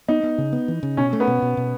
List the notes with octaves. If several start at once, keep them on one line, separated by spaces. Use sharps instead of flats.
B3 D#4
B3
C#3
B3
E3
C#3
B2 C#4
A3
B3
B2
B2
B2